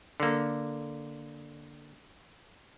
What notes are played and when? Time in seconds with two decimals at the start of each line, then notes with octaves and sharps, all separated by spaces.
0.20 D3 A#3